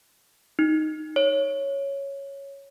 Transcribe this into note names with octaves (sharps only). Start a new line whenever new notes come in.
D#4
C#5